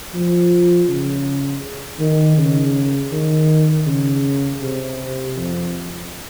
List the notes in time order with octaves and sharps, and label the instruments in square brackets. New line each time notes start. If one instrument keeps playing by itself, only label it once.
[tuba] F3
C#3
D#3
C#3
D#3
C#3
C3
F2